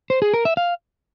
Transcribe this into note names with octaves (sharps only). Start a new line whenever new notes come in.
C5
G#4
A#4
E5
F5